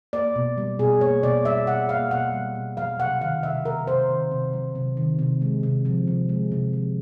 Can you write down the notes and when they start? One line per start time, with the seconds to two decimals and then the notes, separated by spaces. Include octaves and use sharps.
0.13 A#3 D5
0.36 B2
0.57 G3
0.79 B2 G#4
1.01 A#3 C#5
1.23 B2 D5
1.45 G3 E5
1.67 B2 F#5
1.89 A#3 F5
2.11 B2 F#5
2.33 G3
2.55 B2
2.77 F#3 F5
2.99 C3 F#5
3.21 D#3 F5
3.43 C3 E5
3.65 F#3 A#4
3.87 C3 C5
4.10 D#3
4.31 C3
4.53 F#3
4.75 C3
4.97 D#3
5.19 C3
5.42 G#3
5.63 C3
5.85 F3
6.07 C3
6.29 G#3
6.52 C3
6.73 F3